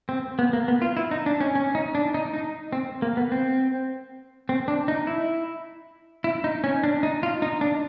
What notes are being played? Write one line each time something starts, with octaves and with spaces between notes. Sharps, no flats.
C4
B3
A#3
B3
F4
E4
D#4
D4
C#4
C#4
D#4
D4
D#4
D#4
C4
A#3
B3
C4
C4
D4
D#4
E4
E4
D#4
C#4
D4
D#4
F4
D#4
D4